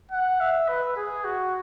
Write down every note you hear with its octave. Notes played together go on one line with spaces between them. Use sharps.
F#5
E5
B4
G#4
F#4